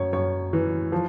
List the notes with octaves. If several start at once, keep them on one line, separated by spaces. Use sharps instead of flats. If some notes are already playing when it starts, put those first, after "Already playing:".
Already playing: F#2 C#5
F#2 C#5
E3
F3